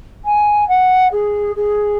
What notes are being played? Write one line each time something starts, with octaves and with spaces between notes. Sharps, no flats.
G#5
F#5
G#4
G#4